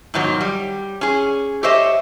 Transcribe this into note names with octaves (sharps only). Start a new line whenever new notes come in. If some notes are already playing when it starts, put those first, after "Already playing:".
G#2 B2 D#3 F#3
G3
C#4 G#4
G4 A4 C5 C#5 D#5 E5